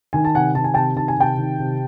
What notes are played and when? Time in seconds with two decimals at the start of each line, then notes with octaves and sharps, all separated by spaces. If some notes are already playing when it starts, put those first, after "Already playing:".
0.13 D#3 G#5
0.25 A5
0.35 C3 F#5 G#5
0.55 D#3 A5
0.64 G#5
0.74 C3 G5 A5
0.96 D#3 A5
1.08 G#5
1.17 C3 G5 A5
1.38 D#3
1.59 C3